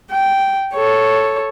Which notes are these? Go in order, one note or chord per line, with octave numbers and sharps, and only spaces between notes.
G5
A4 C#5